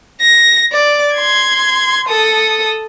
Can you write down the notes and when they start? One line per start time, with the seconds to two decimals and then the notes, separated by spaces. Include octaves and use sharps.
0.22 A#6
0.73 D5
1.14 C6 G#6
2.08 A4 D#6